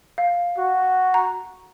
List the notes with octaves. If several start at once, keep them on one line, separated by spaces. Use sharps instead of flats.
F5
F#4
A#5